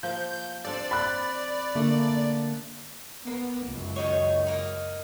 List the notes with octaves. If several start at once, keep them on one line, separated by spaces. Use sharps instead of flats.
F3 A#3 G6
C4 D4 A4 D5
B5 F#6
D3 A3 A#3 D4
A#3 B3
C#2 F#2
D#3 D#4 C#5
A#3 D#4